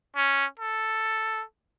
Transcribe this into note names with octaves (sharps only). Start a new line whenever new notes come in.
C#4
A4